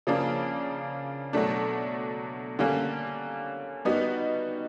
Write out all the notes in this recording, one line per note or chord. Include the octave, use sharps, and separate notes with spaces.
C#3 F3 A#3 D4
B2 F#3 A3 D4
D3 G3 A#3 C#4
G3 B3 D#4 F#4